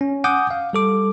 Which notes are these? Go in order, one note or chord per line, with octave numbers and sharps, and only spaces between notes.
C#4
F#5 G#5 D6 D#6 G6
F5
G3 A4 D6